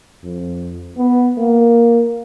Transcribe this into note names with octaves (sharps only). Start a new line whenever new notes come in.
F2
B3
A#3